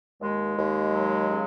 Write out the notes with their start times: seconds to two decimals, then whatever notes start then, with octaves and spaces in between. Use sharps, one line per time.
0.21 D#2 G#3
0.57 D#2
0.92 F#3
1.28 C#3